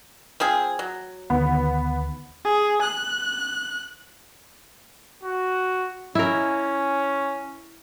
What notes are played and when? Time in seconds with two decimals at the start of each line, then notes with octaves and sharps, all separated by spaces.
0.40 F3 C4 G#4
0.79 F#3
1.30 D2 D#3 B3
2.45 G#4
2.82 F#6
5.23 F#4
6.15 C#4 E4 A#4